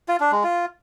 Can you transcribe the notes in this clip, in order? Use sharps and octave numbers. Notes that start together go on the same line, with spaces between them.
F4
D4
G#3
F4